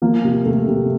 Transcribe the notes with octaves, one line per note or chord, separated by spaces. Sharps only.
F3 A#3
C3
C3 A3
C3